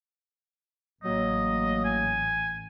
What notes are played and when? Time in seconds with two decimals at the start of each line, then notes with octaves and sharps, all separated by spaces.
1.04 A1 F#3 A#3 D#5
1.85 G#5